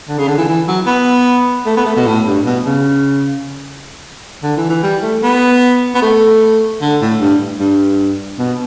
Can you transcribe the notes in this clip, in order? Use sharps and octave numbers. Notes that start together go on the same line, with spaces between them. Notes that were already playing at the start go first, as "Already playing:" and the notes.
D3
C#3
D3
E3
E3
F#3
B3
A3
B3
A3
B2
A2
G2
B2
C#3
D3
E3
E3
G3
A3
B3
B3
A3
D3
A2
G2
G2
B2